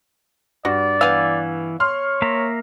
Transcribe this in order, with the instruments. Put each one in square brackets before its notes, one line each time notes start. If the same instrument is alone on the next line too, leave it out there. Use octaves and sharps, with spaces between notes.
[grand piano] G2 [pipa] F#4 [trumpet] D5
[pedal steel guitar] E3 G#5 E6 [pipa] B3 F5
[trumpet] C#5 [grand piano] C6 F6
[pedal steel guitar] A#3 E5 A#5